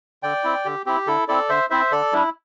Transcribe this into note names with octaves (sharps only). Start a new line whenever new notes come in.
D3 D5 G5
C4 E4
D3 G4
C4 E4 G4
D3 E4 A4
C4 E4 A4 D5
D3 C5 E5
C4 E4 C5 E5
D3 A4 D5
G3 D4 E4